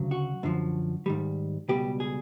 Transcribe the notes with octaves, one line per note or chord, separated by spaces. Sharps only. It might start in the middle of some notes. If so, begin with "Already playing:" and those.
Already playing: D2 C#3 F#3
F#4
F#2 D3 F3
G#2 D#3 G3
C#2 B2 G3 G4
G#4